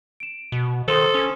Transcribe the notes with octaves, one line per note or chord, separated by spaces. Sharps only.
D7 E7
B2
D#3 A4 C5 C6 D#6
C#4